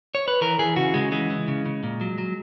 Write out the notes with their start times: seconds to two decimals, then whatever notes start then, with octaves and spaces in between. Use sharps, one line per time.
0.15 C#5
0.28 B4
0.41 E3 A#4
0.59 E3 G#4
0.76 C#3 F#4
0.94 C#3 G#3
1.12 E3 G#3
1.30 E3
1.48 C#3
1.65 C#3
1.83 A#2
2.01 F#3
2.18 F#3